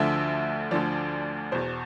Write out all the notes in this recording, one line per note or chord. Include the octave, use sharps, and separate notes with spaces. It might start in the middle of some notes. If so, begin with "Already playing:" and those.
Already playing: D2 D3 F3 E5
D2 D3 F3 D5
E2 B2 C5